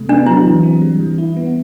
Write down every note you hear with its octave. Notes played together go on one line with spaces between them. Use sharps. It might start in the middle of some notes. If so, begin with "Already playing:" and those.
Already playing: C3 A3
B3 D4
F#3 E4
E3
C4
G3
E3
E4
B3